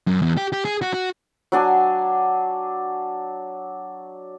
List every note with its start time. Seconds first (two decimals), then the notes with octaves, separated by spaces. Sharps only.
0.07 F#2
0.22 E2
0.37 G4
0.53 G4
0.65 G#4
0.82 F#4
0.94 F#4
1.52 F#3 D4 G#5